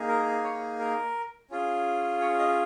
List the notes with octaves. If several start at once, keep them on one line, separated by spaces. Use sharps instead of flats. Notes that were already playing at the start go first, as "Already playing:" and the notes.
Already playing: A#3 D#4 G#4
A#4
C#5
A#4
C#4 F4 G#4
C#5
D#5